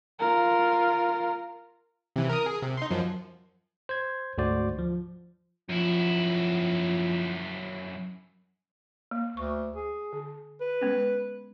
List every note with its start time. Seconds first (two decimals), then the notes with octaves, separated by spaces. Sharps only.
0.20 F4 A#4
2.16 C3 E3
2.29 A#4 D#6
2.46 G#4
2.62 C3
2.77 D#4 C6
2.90 F#2 F3
3.89 C5 G#6
4.38 D2 G#2 D3 F#4 C5 D5
4.79 F3
5.69 F#2 F3 E4
9.11 A#3
9.37 D2 C#6
9.76 G#4
10.13 D3
10.61 B4
10.81 G#3 B3 C#4